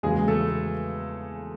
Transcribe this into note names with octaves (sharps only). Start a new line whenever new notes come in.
E2 C#3 F#3 G#3 A#3 G#4
A3 A4